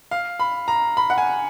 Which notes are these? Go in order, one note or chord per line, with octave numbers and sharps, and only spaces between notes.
F5
B5
A#5
B5
F#5
G#5